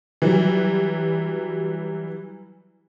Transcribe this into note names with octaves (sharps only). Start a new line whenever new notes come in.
E3 F#3 G3